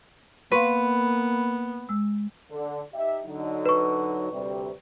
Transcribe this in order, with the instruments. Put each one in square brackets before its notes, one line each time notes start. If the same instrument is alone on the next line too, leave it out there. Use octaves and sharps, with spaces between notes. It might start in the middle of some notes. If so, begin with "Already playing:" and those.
[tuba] A#3 [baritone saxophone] B3 [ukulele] B4 [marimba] F5 C6 C#6
[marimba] G#3 E6
[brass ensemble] D3
D#4 G4 E5
D3 F#3 D#4
[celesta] B4 C#6
[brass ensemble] D2 C3 G3